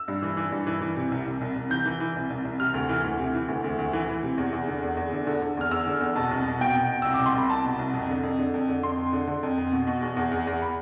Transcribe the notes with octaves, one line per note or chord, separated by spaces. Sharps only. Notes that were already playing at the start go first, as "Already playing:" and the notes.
Already playing: E6
G2
E3
E3
G2
E3
E3
C3
C2
C2
C2
C2
E3 G6
E3
E3
C2
C2
C2
C3 F6
D2
E3
D2
C3
E3
D2
D2
D2
E3
E3
C3
E2
E2
D3
E2
E2
D3
D3
D3
E2 F6
E2 E6
D3
E2
B2 A5
C2
B2
B2 G5
B2
B2
C2 E6
D6
C2
C6
C2 B5
C2 A5
B2
C2
F2
D3
F2
D3
F2
D3
F2 C6
F2
D3
D3
F2
F2
B2
B2
E2
E2
E2
E2
B5